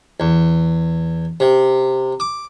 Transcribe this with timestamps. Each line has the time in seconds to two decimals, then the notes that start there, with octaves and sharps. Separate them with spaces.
0.20 E2
1.40 C3
2.20 D6